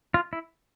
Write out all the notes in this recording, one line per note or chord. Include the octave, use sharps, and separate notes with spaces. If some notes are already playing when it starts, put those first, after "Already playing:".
F4
E4